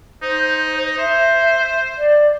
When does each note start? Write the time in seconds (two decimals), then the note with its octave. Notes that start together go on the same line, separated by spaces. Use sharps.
0.22 D#4 C5
0.98 C5 E5
1.98 D5